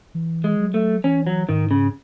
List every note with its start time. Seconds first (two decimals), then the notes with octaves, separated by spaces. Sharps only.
0.15 E3
0.44 G#3
0.59 F#3
0.74 A3
1.04 E3 C#4
1.27 F#3
1.49 G#2 D#3
1.71 C#3